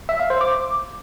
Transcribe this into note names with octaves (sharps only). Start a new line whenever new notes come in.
E5
F5
C5
D6